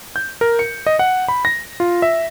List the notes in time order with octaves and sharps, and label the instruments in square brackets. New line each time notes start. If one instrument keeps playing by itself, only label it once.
[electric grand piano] G6
A#4
C#7
D#5
F#5
B5
A#6
F4
E5